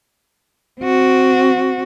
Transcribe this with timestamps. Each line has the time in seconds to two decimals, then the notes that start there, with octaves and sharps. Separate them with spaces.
0.81 C4 F#4